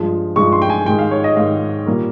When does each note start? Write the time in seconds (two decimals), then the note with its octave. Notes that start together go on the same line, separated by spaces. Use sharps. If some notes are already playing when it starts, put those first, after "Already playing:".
Already playing: G2 F3 G#3
0.36 G2 F3 G#3 C#6
0.52 C6
0.62 G5
0.70 G#5
0.86 G#2 D#3 G#3 G5
0.99 F5
1.11 C#5
1.24 D#5
1.37 G#2 D#3 G#3 F5
1.87 A#2 G3 A#3